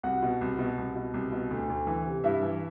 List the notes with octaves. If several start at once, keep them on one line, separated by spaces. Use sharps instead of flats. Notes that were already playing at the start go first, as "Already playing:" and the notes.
C2 F#4 F#5
B2
C2
B2
C2
B2
C2
B2
D2
D2
E3
C3
G2 E4 E5
E3